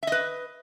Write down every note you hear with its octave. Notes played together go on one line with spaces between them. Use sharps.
B4 D#5 E5